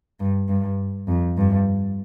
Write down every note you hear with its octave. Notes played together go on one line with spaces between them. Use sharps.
G2
G2
F2
G2